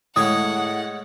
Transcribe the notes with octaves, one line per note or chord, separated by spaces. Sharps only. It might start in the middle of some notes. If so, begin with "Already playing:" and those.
A2 G#3 C#5 F#5 D#6